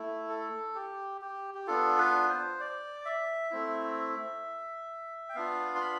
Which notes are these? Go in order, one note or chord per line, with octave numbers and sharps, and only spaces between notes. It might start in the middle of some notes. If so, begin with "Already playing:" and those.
Already playing: A3 E4
A4
G4
G4
G4
B3 D4 F4 A4
B4
C5
D5
E5
A3 C4 E4
G5
B3 D4 F4 F5
C6
B5